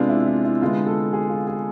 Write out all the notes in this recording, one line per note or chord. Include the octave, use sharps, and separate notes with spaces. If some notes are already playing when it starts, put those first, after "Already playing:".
Already playing: C3 G#3 B3 D4 F4
E4
E4
E4
D3 G#3 B3 F4
A4
G#4
F4
G#4